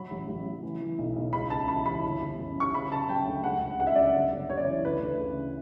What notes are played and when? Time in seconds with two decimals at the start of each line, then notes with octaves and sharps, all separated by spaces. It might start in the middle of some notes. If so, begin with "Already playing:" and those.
Already playing: F#3 B5
0.11 A1
0.28 A1
0.45 F#3
0.63 E3
0.80 E3
0.99 B1
1.16 B1
1.33 C#2 B5
1.50 C#3 A5
1.68 E3 B5
1.86 E3 B5
2.04 G1
2.22 G1
2.39 F#2
2.56 F#3 C#6
2.74 C#3 B5
2.91 C#3 A5
3.09 F#3 G5
3.26 D2
3.44 C#2 F#5
3.62 C#2
3.79 C#3 F#5
3.87 E5
3.95 F#3 D5
4.03 E5
4.14 G1
4.33 G1
4.50 F#2 C#5
4.57 D5
4.65 E3 C#5
4.85 D2 B4
5.02 D2
5.19 C#3